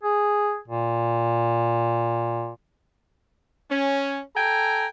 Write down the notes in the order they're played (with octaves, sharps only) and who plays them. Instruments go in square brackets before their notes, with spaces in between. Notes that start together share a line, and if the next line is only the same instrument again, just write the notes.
[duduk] G#4
A#2
[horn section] C#4
A4 G5 G#5 A#5